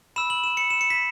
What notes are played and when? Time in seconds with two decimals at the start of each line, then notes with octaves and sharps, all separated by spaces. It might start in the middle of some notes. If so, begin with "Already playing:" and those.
0.16 B5 E6 E7
0.30 F#7
0.44 E7
0.57 C#7
0.70 E7
0.81 C#7
0.90 B6